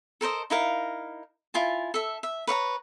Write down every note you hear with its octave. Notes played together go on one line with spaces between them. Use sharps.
A4 A#4 C5 D#5
D#4 E4 A#4 F5
E4 F4 G#5 A5
A4 E5
E5
B4 C#5 F5 A#5